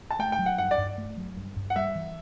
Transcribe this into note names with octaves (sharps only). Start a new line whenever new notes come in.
A5
A3 G5
G5
F#3
F#5
G2 F#5
D5
G2
A3
F#3
G2
G2
F#5
G3 E5
E3